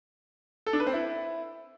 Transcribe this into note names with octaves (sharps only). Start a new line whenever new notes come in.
A4
D4
B4
C4
E4